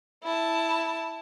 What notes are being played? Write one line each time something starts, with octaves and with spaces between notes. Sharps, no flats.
E4 A5